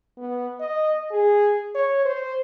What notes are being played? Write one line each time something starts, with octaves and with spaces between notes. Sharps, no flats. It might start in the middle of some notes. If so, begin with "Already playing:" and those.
B3
D#5
G#4
C#5
C5